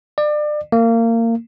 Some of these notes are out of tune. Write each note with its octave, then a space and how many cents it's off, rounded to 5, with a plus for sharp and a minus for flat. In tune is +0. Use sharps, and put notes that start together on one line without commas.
D5 +30
A#3 -25